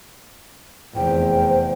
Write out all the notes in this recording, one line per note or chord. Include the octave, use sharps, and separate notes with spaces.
F1 E2 C5 G5